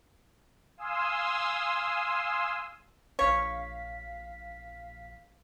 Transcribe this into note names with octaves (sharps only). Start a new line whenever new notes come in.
F5 G#5 C6 D#6 E6
A#1 C#5 F5 B6